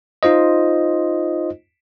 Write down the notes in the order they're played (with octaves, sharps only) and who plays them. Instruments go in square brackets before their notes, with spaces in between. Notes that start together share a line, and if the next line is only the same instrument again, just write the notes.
[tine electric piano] D#4 F4 C5 D#5